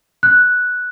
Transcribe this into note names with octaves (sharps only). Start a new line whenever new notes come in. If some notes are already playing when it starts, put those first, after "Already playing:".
F#6